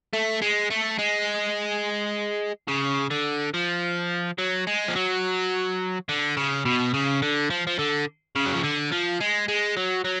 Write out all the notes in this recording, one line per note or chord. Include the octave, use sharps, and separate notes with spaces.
A3
G#3
A3
G#3
C#3
D3
F3
F#3
G#3
F3
F#3
D3
C#3
B2
C#3
D3
F3
F3
D3
C#3
F#3
F3
D3
F3
G#3
G#3
F#3
F#3